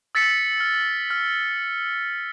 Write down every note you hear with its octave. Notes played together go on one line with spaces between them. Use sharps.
E6 A6 B6 C#7
F6
F6